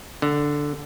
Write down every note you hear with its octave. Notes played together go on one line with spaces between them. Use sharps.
D3